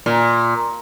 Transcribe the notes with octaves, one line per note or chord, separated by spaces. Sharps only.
A#2